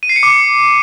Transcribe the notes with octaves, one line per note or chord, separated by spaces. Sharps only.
D#7
C7
C#7
D6